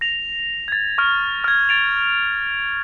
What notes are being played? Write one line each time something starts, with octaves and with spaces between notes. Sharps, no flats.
A#6 F7
G#6 A6
C#6 F6
F6 G#6
A6 D7 F7